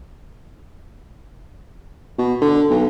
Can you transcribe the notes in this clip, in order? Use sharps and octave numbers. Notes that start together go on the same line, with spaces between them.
B2
D3
B1